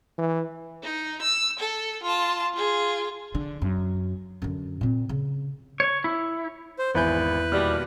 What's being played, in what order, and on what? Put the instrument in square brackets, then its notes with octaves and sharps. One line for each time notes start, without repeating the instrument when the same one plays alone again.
[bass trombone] E3
[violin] D#4
E6
A4
F4 A5
F4 G#4
[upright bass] D3
F#2
F#2 D3
A#2 C4
C#3
[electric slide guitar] C#5
E4
[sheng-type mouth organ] C5
[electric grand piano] G#1 G#5 [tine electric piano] E2 E4 G6 [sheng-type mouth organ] B4
[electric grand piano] D#2 B2 F6 [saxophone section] G3